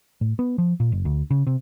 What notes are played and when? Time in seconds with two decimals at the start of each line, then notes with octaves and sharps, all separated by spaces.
0.21 A2
0.39 B3
0.58 F3
0.80 A#2
0.92 F#1
1.05 D2
1.31 C#3
1.47 C3